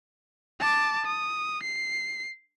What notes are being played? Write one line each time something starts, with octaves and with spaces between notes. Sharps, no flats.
A5 D6
D#6
C7